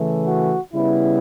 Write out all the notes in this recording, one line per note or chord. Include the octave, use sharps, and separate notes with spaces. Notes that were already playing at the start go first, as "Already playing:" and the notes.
Already playing: C#3 E3 A3
F#4
C#3 G3 B3 E4